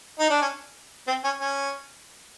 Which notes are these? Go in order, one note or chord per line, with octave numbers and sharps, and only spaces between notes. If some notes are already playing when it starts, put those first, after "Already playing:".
D#4
D4
C#4
C4
C#4
C#4